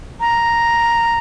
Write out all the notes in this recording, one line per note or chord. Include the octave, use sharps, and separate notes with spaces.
A#5